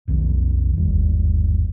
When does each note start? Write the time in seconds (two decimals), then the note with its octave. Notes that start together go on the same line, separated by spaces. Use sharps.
0.08 F1 B1 D#3
0.77 G1 D#2 G3